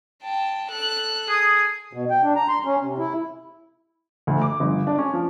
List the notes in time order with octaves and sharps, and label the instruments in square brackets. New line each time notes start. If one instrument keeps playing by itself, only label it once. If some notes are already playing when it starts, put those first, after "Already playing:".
[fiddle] G5 A5
A4 F#6
[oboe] G#4 [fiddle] D#6
[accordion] B2
G5
D4
A#5
C6
C#4
C3
E4
[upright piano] D2
D6
G1
D4
C#4
F3